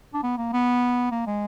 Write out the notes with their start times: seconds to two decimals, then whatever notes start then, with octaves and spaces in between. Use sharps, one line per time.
0.14 D4
0.23 B3
0.37 A#3
0.53 B3
1.11 A#3
1.27 G#3